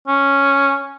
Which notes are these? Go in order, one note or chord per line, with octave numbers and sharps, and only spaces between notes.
C#4